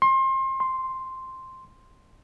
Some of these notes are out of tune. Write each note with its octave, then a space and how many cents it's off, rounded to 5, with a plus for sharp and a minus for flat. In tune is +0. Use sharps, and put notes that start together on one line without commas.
C6 +30
C6 +0